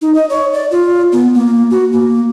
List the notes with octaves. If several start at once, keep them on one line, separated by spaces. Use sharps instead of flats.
D#4
D#5
C#5
D5
F4
B3
A#3
F#4
A#3